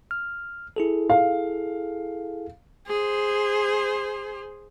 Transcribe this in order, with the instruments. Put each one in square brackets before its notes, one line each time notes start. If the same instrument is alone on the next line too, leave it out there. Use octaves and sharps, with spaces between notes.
[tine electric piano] F6
E4 G#4 A4
[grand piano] F5
[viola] G#4 C5